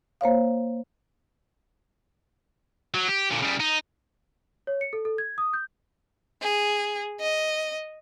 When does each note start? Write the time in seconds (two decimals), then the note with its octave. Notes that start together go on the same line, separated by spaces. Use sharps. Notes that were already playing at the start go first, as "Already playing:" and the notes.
0.21 A#3 C5 C#5 F5
2.95 F#3
3.08 G4
3.31 A#2 D3
3.42 C#3 G3
3.60 D#4
4.67 C#5
4.81 C#7
4.93 A4
5.05 A4
5.18 G#6
5.38 D#6
5.53 G6
6.42 G#4
7.21 D#5